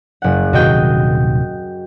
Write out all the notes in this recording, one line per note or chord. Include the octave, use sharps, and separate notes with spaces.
F#1 F#5
D#1 C3 D#3 F#4 D#5 G5